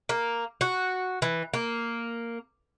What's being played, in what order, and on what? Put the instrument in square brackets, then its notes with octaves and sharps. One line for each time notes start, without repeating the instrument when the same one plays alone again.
[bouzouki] A#3
F#4
E3
A#3